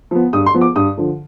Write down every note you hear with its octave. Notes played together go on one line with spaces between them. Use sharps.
F3 B3
G2 D#6
C6
F3 B3
D6
G2 D#6
D3 F3